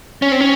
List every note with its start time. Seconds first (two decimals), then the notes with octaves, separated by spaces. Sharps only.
0.22 C#4
0.32 C4
0.41 C#4